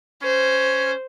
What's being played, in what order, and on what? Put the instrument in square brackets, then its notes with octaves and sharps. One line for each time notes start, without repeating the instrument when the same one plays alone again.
[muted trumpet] C#4 [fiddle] C5